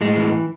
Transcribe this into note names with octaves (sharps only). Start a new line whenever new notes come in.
A2 G#3
E3